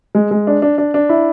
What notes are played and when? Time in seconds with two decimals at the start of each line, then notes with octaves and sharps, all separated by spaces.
0.15 G#3
0.31 G#3
0.47 D4
0.62 D4
0.78 D4
0.94 D4
1.09 E4